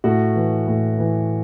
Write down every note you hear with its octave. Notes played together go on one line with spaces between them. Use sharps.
A2 F#4
E3
A2
E3